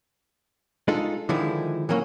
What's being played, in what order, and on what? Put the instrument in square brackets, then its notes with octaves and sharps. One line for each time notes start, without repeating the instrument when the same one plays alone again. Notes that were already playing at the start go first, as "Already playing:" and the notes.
[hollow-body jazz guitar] G#3 D4 D#4 F4 A4
D3 D#3 F3 G#3 E4
E3 F#3 A#3 C#4